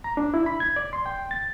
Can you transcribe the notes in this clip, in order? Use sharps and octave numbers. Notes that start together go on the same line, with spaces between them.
A#5
D4
E4
B5
G#6
D5
C6
G5
A6